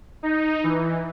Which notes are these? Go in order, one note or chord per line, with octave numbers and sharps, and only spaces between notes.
D#4
E3